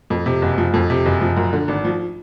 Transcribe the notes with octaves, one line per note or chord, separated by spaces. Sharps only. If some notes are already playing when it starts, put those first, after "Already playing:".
F2
C3
F#1
F3
F2
C3
F#1
F3
F#2
D3
G#1
F3